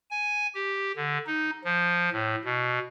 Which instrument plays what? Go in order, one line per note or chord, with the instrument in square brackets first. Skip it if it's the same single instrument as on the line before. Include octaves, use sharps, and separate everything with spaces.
[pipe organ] G#5
G4
D3
D#4
F3
A2
B2